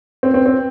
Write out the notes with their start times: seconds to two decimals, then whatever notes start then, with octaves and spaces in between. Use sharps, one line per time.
0.23 C4
0.34 C4
0.46 C4